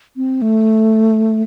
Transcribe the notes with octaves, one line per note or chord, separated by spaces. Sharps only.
C4
A3